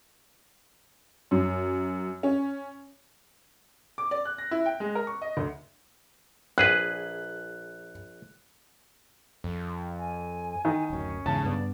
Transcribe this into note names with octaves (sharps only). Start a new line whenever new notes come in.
F#2
C#4
D6
D5
F#6
A#6
E4
G5
G#3
A#4
C#6
D#5
D2
A#1 G#4 B4 F#6
F2
G#5
D#3
D1 F#2 C#4
E2 G#2 C#3 A5
G2 B3 D5